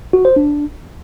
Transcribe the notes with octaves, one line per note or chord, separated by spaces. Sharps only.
F#4
C5
D4